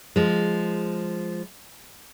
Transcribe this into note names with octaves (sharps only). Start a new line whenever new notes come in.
F3 G#3